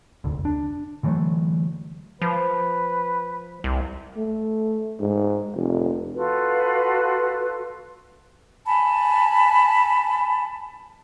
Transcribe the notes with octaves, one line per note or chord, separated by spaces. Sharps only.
F1 D2
D4
D3 E3 F#3 A3
F3 B4
C2
A3
G#2
F1
F4 F#4 A4 B4
G#5 A5 B5